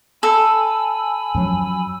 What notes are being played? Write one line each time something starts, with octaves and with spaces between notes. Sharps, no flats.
A4 G#5 B5 E6
F#2 F3 F#3